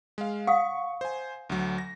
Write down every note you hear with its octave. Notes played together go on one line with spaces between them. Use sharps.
G#3 F5
F5 F#5 C#6 D#6
C5 G#5
D2 F#3
A#6